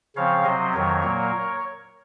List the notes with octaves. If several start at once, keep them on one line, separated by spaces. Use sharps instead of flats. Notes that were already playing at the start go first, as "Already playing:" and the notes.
C#3 F3 C4 C#5 F5
C3 F#3 C4 C5 D#5
F2 D#3 F#3 A#4 C#5
A#2 F#3 A#3